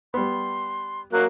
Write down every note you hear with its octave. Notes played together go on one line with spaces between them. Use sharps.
G3 B3 C6
F#3 A#3 F#6